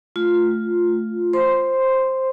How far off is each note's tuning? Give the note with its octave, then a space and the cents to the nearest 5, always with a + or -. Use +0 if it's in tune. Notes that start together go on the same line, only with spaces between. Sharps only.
A3 -5 F4 +0
C5 +10 C6 -10